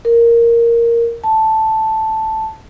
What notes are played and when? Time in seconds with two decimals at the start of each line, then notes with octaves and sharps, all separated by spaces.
0.05 A#4
1.24 A5